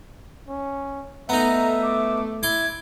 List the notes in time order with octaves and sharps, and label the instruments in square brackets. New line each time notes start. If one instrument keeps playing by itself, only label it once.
[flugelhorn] C#4
[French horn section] A3 [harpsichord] B3 D#4 [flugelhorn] E5 [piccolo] A#5
[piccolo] D6
[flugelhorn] E4 [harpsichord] C6 D6 [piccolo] G#6